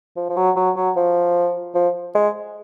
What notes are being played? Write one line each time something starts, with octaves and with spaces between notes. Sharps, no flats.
F3
F3
F#3
F#3
F#3
F3
F3
G#3